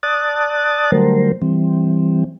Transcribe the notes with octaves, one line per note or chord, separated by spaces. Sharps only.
D5 A5 D#6 F#6 A6
D3 F#3 G3 A3 A#4 C5
E3 G3 C4